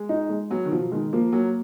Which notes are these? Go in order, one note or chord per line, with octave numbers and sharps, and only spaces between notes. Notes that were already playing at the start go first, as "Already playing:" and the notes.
Already playing: G#3
D#4
G#3
F#3 B3
D#3
B2 F3
D#3 G#3
F3 A#3
F#3 A#3